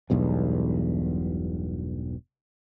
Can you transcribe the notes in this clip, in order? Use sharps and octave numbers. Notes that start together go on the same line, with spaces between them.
E1 B1 E2 G2